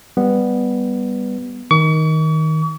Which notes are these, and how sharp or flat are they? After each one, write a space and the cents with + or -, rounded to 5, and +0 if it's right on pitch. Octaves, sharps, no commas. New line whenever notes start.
G3 +10 B3 +0
D#3 +15 C#6 +40